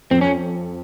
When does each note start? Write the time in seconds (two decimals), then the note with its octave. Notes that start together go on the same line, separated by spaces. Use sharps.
0.11 F2 C4
0.21 C#4